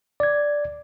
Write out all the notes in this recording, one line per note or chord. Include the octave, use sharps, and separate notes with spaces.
D5 G#6